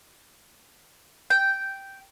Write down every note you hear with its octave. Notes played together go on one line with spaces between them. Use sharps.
G5